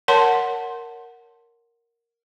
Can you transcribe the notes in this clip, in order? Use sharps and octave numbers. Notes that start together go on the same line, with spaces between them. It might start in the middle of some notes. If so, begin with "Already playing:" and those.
A#4 C#5 F#5 A5 C6